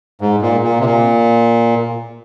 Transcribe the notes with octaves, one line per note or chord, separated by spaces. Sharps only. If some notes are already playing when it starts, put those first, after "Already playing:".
G#2
A#2
A#2
C3
A#2